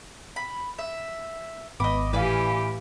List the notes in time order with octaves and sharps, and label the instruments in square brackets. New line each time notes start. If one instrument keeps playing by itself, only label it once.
[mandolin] B5
E5
[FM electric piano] G#1 B3 D6 [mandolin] D#5 B5
[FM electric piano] A2 E4 F5 [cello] E3 G4 [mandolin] B4 D5 G#5